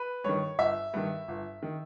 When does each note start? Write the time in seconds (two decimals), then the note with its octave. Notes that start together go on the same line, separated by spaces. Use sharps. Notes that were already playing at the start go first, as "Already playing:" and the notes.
Already playing: B4
0.24 G2 D#3 C#5
0.58 G1 E5
0.94 G2 D#3
1.28 G1
1.63 D#3